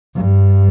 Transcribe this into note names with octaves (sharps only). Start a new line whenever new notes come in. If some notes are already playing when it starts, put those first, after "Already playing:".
G2